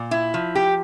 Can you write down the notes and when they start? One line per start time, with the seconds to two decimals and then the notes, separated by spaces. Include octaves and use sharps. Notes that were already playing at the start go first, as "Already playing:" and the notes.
Already playing: A#2
0.11 E4
0.34 F3
0.55 G4